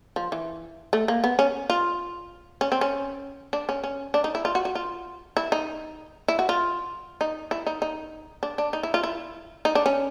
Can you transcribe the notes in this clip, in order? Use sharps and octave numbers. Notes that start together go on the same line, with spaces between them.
F3
E3
A3
A#3
B3
C#4
F4
C#4
C4
C#4
D4
C#4
C#4
D4
D#4
E4
F4
F#4
F#4
F4
E4
D#4
E4
F#4
F4
D#4
E4
D#4
D#4
D4
D4
D#4
E4
F4
E4
D#4
D4
C#4